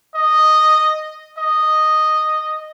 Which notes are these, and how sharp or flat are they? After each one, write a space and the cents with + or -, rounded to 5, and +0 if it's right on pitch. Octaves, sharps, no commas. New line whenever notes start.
D#5 -5
D#5 -5